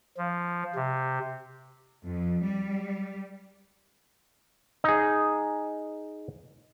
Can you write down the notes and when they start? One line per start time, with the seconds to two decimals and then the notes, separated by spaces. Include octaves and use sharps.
0.17 F3
0.75 C3
2.05 F2
2.43 G3
4.84 D#4 G#4